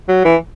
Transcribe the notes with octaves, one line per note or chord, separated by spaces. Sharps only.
F#3
E3